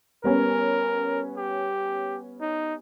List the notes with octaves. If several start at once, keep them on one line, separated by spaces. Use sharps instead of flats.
G3 B3 C#4 A#4
G4
D#4